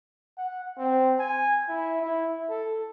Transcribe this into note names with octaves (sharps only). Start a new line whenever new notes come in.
F#5
C4
G#5
E4
E4
A4